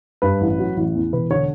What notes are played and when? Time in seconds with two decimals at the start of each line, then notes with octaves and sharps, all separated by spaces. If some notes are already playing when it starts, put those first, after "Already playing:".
0.22 G2 B4
0.41 A1
0.59 F#3
0.77 A1
0.95 E2
1.13 E1 B4
1.30 D3 C#5